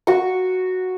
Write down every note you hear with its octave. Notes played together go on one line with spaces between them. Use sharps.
F#4 C#6